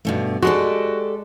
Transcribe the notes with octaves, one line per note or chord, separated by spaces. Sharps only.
G2 B2 A3
G#3 F#4 G4 A4 D5